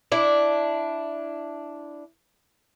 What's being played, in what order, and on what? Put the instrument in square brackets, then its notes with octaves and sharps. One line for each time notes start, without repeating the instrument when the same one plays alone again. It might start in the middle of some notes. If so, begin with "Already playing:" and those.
[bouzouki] D4 E4